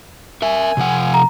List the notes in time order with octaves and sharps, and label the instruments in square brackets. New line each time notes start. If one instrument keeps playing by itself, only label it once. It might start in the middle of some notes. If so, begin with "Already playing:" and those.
[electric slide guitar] A#4 E5 [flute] G#5
[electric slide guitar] C3 F3 F#5
[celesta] A#5